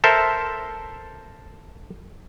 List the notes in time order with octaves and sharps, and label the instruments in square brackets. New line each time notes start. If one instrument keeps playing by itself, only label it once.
[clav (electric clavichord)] A4 A#4 C5 E5